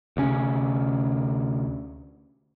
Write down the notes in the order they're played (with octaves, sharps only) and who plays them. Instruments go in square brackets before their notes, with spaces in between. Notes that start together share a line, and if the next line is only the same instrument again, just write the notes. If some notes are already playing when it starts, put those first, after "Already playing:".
[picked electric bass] D2 C3 C#4